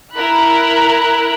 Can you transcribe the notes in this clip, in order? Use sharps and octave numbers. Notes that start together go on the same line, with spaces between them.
E4 A#4 B5 F#6